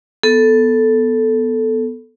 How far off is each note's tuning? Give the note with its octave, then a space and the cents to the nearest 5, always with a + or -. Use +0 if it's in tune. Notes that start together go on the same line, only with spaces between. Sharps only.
B3 +0 A4 +0